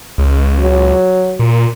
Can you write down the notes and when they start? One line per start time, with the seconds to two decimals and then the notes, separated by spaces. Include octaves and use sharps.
0.18 C#2
0.60 F#3
1.39 A#2